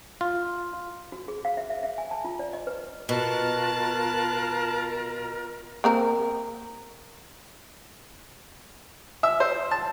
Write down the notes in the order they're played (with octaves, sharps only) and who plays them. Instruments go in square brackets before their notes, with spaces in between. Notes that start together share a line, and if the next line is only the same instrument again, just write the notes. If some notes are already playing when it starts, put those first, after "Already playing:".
[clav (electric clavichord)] F4
[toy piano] F#4
G#4
F5
E5
E5
E5
G#5
A5
F4
D5
D#5
B4
[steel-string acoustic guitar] B2 [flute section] F4 A#4 B4 [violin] A5 F#6
[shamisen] A#3 C4 A#4
[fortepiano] E5
C5
A5